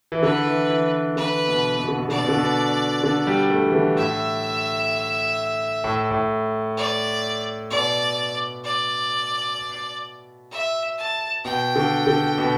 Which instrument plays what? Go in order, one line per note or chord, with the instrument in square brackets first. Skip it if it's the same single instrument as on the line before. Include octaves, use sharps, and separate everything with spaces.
[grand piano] E3
[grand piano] D3 [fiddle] B4
[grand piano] E3
E3
[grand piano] D3 [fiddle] B4
[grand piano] B2
B2
D3
B2
[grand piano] D3 [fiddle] D5
[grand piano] B2
D3
B2
D3
G3
A3
E3
D3
[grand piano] A2 [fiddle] E5
[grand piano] A2
A2
[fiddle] D5
[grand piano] B2 [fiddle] D5
[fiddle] D5
E5
A5
[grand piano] B2 [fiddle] G5
[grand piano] D3
D3
B2